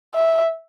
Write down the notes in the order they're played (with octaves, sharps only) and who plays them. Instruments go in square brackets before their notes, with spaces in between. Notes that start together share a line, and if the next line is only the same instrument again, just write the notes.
[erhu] E5